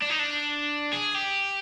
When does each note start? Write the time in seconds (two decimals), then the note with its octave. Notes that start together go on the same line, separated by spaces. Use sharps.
0.02 D4
0.10 D#4
0.19 D4
0.93 G#4
1.15 G4